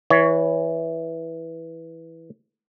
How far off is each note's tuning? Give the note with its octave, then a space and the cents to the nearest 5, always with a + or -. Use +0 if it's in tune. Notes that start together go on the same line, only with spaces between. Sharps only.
E3 -5 C#5 +20